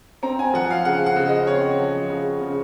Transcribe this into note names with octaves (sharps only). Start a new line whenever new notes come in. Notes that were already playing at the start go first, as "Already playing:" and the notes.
C4 A#5
G#5
F3 F#5
F5
C#3 F#5
F#5
C#3
D#5
C4 C#5
F3
C#3
C#3